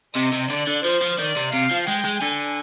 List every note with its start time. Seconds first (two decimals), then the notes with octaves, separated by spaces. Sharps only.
0.15 C3 D#5
0.33 C3
0.50 D3 D5
0.67 D3
0.85 F3 C5
1.02 F3
1.19 D#3 D5
1.36 C3
1.53 C3 F5
1.71 F3
1.87 G#3 G5
2.05 G#3
2.22 D3 G#5